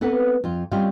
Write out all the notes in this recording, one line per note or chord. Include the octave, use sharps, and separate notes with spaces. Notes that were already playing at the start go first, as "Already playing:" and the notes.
B3 C4 A4 B4 F#5
F2 F4
G3 C4 C#4 F4 D#5 F5